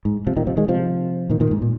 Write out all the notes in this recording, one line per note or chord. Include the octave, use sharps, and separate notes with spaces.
G#2
C3 F3
A#2 D#3
C3 F3
D#3 G#3
C3 F3
A#2 D#3
A#2 D#3
G#2
A#2